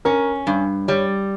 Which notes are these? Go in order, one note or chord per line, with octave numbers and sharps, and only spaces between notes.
C#4 A#4
G2
G3 C#5